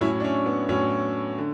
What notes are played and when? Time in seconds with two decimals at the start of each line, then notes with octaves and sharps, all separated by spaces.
0.01 A2 F#3 C#4 E4
0.20 D4
0.24 C#4
0.46 B3
0.69 A2 F#3 C#4
1.38 D3